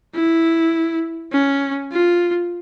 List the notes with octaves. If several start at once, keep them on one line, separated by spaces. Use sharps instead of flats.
E4
C#4
F4